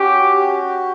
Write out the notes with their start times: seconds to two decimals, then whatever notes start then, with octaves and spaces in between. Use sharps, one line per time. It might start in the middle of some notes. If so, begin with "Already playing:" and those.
Already playing: C#4 F#4 G4
0.40 G4